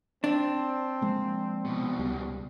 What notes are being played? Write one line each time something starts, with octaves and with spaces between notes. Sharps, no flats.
C4 D4
F3 G#3 A#3
C2 B2
C#2 G3